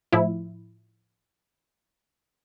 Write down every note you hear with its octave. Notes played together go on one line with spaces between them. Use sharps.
A2 F3 E4